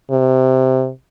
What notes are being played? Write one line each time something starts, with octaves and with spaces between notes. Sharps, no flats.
C3